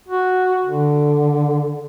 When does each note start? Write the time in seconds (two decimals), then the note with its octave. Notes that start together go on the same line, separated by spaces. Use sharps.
0.08 F#4
0.64 D3